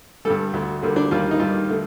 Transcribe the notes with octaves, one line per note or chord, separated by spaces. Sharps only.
G2 D3 G3 A4
D2 D3 A3
D2 D3 G3 A#3
D4
D#2 D#3 G3 A#3 F4
D#4
G2 D#3 G3 F4
D3 A3